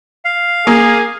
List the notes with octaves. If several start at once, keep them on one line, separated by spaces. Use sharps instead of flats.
F5
A#3 G#4